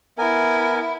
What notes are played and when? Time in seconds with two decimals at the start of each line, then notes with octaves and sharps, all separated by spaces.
0.18 B3 E4 A#4 G#5